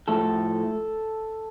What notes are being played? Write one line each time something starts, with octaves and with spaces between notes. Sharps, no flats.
A2 F3 A3 A4